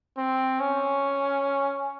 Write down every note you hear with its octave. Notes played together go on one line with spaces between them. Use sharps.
C4
C#4